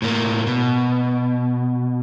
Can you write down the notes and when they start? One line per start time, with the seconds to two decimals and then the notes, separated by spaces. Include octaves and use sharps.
0.02 A2 A#3
0.47 B2